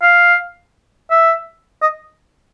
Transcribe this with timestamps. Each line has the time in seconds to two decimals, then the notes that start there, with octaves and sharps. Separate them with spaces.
0.02 F5
1.11 E5
1.82 D#5